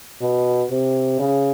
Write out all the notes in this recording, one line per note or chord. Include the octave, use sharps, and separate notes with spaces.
B2
C3
C#3